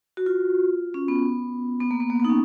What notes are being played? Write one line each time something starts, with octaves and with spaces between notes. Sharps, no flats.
F#4
F4
C#4
B3
B3
A#3
B3
A#3
B3
D#4
C#4